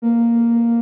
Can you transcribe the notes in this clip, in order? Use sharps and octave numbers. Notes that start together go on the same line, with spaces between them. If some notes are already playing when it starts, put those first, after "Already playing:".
A#3